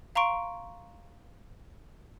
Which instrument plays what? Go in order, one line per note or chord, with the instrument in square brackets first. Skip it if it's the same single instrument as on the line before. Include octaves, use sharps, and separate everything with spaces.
[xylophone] F5 A#5 C6 C#6 D7